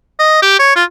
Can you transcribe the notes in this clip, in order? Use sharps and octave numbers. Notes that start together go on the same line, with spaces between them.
D#5
G4
C#5
F4